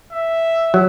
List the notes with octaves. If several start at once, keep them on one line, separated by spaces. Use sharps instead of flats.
E5
F#3